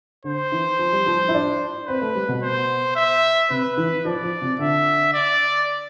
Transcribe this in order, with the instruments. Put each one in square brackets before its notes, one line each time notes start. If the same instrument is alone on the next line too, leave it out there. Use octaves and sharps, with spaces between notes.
[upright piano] D3 [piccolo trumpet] C5
[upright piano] E3
F3
G3
F3
E4
D4
[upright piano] C4 [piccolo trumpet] B4
[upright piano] A3
G3
B2
[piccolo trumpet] C5
E5
[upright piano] C3 [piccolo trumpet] B4
[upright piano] E3
[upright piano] F3 [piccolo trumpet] D5
[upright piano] F3
C3
[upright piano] D3 [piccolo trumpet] E5
[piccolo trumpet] D5